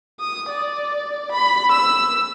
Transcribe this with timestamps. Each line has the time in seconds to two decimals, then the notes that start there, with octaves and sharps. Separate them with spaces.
0.20 D#6
0.49 D5
1.32 B5
1.71 E6